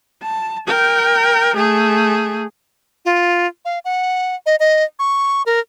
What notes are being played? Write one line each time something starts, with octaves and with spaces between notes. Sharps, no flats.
A5
A#4 G5
A3 G#4
F4
F5
F#5
D#5
D#5
C#6
A#4